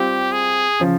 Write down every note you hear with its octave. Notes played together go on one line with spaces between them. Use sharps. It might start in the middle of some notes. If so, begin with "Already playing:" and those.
Already playing: G3 C4 F4 G4
G#4
C#3 F3